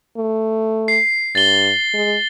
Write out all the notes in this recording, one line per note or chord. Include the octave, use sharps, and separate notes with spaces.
A3
C7
G2 A6 G7
G#3